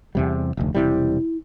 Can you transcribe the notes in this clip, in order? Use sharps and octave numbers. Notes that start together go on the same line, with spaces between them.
E2 C3 G3
F1 D2
E1 C3 G3 E4